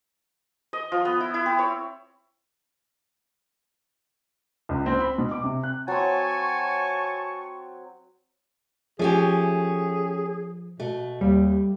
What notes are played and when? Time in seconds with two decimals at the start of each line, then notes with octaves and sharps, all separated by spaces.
0.73 D#5
0.92 F3
1.05 B3
1.20 E4
1.34 E4
1.46 C4
1.59 C#5
4.69 C#2
4.86 C4
5.01 B5
5.18 B2
5.31 D6
5.43 C3
5.63 F#6
5.88 F#3 C4 G#5 A5 C#6
8.99 F3 A3 C#4 G4 G#4
10.80 B2 A3
11.21 D#2 G3